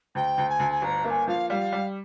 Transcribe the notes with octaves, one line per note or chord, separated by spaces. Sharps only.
D2 G5
D2
G#5
D2
G#5
G1 A#5
A#3 A#5
G#5
F3 F5
G3 F5
G3